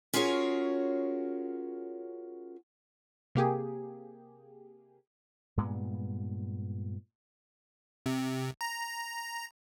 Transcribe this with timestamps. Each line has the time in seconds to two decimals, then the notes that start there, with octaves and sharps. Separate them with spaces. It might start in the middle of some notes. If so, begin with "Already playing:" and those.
0.14 C#4 F4 F#4 G#4 A#4 C#5
3.35 C3 A#3 G4 G#4
5.57 G2 A#2 G#3 B3
8.06 C3
8.61 A#5